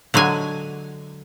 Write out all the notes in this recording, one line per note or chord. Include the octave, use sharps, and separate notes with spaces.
D3 F#3 G#3 G#5